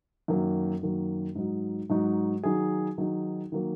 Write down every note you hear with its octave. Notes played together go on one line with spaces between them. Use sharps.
F#2 D#3 F#3 A#3
F#2 D#3 F#3 A#3
G#2 F#3 D#4 F#4
G#2 F#3 D#4 F#4
D#3 F#3 D#4 G#4
D#3 F#3 D#4 G#4
D#3 F#3 A#3